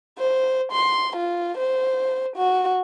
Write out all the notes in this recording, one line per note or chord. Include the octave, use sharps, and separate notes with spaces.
C5
C6
F4
C5
F#4